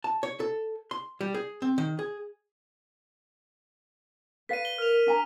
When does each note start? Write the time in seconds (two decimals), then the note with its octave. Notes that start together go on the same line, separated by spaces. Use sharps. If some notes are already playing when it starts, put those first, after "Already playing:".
0.04 A5
0.23 C#5
0.40 A4
0.91 C6
1.21 G3
1.34 G#4
1.62 C4
1.78 D#3
1.99 G#4
4.49 B4 D5 F5 B6 D#7
4.65 G7
4.78 A#4 F6 F7
5.07 D4 G#5 A#5